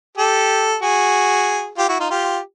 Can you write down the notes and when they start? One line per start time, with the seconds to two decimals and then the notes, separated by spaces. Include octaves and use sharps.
0.18 G4 A4
0.82 F#4 G#4
1.78 F4 G4
1.89 E4 F#4
2.00 D#4 F4
2.10 F4 G4